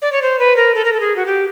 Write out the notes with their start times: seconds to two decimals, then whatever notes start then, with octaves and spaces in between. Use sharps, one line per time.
0.02 D5
0.12 C#5
0.22 C5
0.39 B4
0.56 A#4
0.75 A4
0.85 A#4
0.93 A4
1.00 G#4
1.16 F#4
1.26 G4